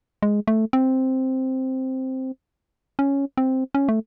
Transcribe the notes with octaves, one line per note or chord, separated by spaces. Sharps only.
G#3
A3
C4
C#4
C4
C#4
A3